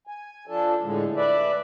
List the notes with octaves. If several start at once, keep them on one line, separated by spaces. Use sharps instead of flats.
G#5
F3 D4 A4
A2 D3 G#3
B4 D5 E5